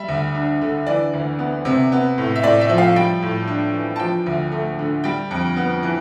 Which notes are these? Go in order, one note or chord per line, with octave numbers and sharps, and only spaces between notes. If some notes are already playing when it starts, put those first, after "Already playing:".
Already playing: G3 E5
D2
D4
D3
E3 D5
D2
B3
C3
B3
A2
E5
A2 D5
E5
F3
F5
G3 G5
A2
D4
E3
A5
F3 G5
D2
A3
D3
G3 G5
F2
B3
E3